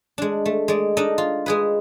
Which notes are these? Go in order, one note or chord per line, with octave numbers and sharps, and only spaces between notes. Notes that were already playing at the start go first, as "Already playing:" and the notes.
G#3 D4
A3
G#3 D5
D4 D#4 A4 D#5
F4
G#3 G#4 B4